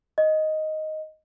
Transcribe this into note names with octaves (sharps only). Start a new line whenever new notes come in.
D#5